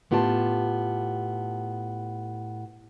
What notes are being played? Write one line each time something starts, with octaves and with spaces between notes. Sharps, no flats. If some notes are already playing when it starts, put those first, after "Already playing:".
A2 B3 F4 G4 E5 A5